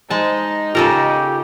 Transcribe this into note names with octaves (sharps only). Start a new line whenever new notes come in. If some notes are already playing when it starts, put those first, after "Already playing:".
G#3 D#4 C5 A5
C#3 F4 G4 A4 A#4 D#5